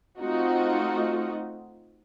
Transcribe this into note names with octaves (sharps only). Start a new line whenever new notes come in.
A3 C4 D#4 F4 F#4 D#5